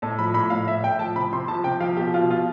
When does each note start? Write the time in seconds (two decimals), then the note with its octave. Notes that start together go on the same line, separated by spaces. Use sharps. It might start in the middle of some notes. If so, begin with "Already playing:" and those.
0.02 A2 A5
0.19 F3 B5
0.34 A2 B5
0.50 A2 F5
0.67 A2 E5
0.83 A2 G5
0.99 F3 A5
1.16 C3 B5
1.32 C3 C6
1.48 F3 A5
1.64 C3 G5
1.80 F3 F5
1.97 B2 G4
2.14 B2 F4
2.30 B2 F4